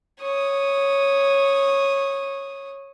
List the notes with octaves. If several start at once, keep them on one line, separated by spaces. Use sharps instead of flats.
C#5 D#6